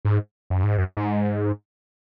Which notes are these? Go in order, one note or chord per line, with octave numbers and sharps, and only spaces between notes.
G#2
F#2
G#2
F#2
G#2